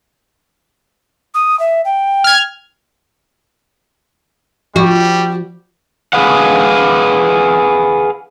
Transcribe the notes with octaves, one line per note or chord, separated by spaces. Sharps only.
D#6
E5
G5
F6 G#6
F3 G3 F#4
G#4 B4 F5 F#5